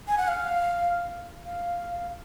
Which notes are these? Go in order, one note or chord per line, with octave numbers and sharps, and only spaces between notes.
G#5
F#5
F5
F5